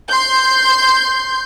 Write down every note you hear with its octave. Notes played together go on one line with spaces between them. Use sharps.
C6 G6